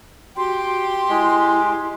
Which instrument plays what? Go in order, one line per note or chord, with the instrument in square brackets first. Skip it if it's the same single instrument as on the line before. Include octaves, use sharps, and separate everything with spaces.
[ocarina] F#4 [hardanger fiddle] G4 [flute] C6
[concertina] G#3 [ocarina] E4